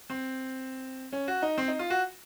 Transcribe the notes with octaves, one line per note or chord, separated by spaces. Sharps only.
C4
C#4
F#4
D#4
C4
D#4
F4
F#4